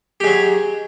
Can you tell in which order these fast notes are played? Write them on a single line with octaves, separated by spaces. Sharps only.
G4 G#3 F#3